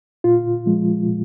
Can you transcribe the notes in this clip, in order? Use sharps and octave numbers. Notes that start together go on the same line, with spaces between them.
A#2 F4
F3 G#3
A#2